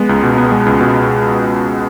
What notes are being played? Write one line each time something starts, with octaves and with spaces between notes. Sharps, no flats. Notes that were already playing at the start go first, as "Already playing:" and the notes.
Already playing: G#3 B3
C#2
B2
B3
G#3
C#2
B2